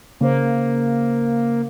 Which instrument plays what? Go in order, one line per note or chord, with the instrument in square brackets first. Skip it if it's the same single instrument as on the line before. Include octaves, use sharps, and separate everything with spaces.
[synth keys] C#3 C5 [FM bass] A#3